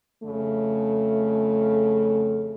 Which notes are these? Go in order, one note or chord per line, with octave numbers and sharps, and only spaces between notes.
F2 C#3 A3